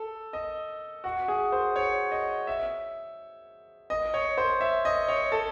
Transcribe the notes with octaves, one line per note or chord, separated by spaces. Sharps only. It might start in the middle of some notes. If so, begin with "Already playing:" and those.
Already playing: A4
D#5
F#4
G#4
C5
C#5
D#5
E5
D#5
C#5
C5
E5
D#5
C#5
A4